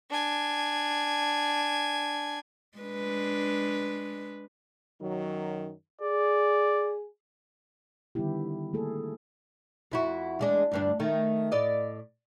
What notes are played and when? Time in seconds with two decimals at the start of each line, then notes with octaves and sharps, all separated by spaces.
0.10 D4 G#5
2.79 G#3 D4 B4
5.02 F#2 D#3 F#3
6.01 G#4 D5
8.15 D3 D#3 G3 B3 E4 G4
8.73 A3 A#3 G#4 A4
9.92 F2 E4 F#4
10.39 E2 G#3 D4
10.71 D2 G2 D4
11.00 D#3 A3
11.52 A2 D5 D#5